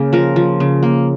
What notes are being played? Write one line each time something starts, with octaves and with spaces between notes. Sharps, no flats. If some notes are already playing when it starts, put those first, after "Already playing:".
Already playing: C#3 A#3
F3 A#4
F3
C#3
A#3